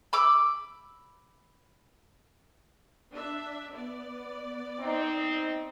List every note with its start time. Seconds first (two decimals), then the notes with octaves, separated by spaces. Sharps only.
0.13 B5 D6 E6
3.12 D4 E5
3.73 B3 D5
4.80 C4 D#4